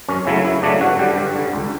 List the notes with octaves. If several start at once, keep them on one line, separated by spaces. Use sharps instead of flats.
F#2 C#4
C#3 F#3 A3 E4
F#2 E4
C#3 F#3 A3 D4
G2 F#4
D3 G3 G4
G2
D3 G3
C#2